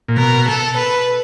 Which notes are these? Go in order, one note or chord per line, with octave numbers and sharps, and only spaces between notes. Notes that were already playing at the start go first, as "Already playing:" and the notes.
A#2
B2 A#4
A4
B4